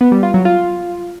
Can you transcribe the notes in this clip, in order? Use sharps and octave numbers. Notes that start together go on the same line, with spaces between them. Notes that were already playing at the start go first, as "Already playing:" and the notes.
B3
G3
F4
F#3
F4